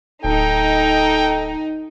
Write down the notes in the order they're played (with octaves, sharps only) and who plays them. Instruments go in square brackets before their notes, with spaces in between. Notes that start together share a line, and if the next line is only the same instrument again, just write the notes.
[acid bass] D1 [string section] D#4 [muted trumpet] A4 [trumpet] G5